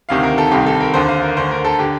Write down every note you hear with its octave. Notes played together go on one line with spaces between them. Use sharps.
D2 C3 D#3 F5
A#4
A4
C2 C3 D#3 G4
A4
A#4
D#2 D3 C5
F5
A#4
D2 D3 C5
A#4
A4
D3 G4